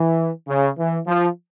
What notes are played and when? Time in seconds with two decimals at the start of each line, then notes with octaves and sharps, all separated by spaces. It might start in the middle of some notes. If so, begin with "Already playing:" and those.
Already playing: E3
0.48 C#3
0.78 E3
1.07 F3